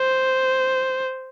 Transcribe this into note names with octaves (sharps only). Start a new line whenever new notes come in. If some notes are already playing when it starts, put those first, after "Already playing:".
Already playing: C5